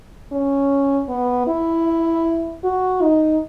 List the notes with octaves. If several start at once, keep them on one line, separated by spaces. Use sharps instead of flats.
C#4
B3
E4
F#4
D#4